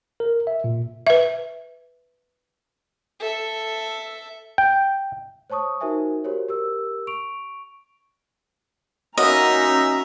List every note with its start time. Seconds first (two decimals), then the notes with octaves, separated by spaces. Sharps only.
0.20 A#4
0.47 E5
0.64 A#2
1.07 B4 E5
3.20 A4 E5
4.58 G5
5.50 C5 C#5 A5 C#6 D#6
5.81 D#4 F#4 A#4 C5 E5 G#5
6.24 F#4 G4 A#4 C5 C#5
6.48 G4 A#4 E6
7.07 C#6 D7 F7
9.18 F#3 A#3 B3 C#4 D#4 D#5 E5 A#5